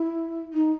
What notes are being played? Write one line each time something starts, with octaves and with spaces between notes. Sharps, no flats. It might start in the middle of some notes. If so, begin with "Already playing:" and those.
Already playing: E4
D#4